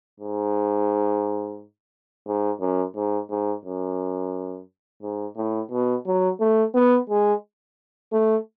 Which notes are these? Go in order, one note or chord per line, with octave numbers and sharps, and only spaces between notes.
G#2
G#2
F#2
G#2
G#2
F#2
G#2
A2
B2
F#3
A3
B3
G#3
A3